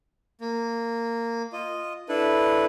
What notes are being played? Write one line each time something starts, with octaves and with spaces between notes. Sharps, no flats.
A#3
F4 D#5
D4 E4 A4 B4